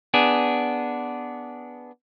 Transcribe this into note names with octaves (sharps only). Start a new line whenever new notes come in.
B3 D4 G#4